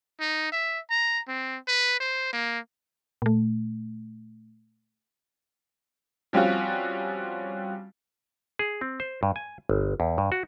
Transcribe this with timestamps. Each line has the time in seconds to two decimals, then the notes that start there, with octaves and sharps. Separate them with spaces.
0.20 D#4
0.52 E5
0.90 A#5
1.28 C4
1.67 B4
2.00 C5
2.33 A#3
3.22 A#2 A3
6.33 F3 G3 C4 C#4 F4 F#4
8.59 G#4
8.81 C4
9.00 C5
9.23 G2
9.36 G#5
9.69 G1
10.00 E2
10.18 G2
10.32 F#4